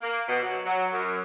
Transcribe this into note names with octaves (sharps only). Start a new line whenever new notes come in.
A#3
B2
F#3
F#3
F#2